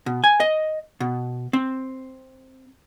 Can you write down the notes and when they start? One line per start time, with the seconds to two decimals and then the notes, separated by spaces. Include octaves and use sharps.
0.06 B2
0.24 G#5
0.40 D#5
1.00 B2
1.53 C4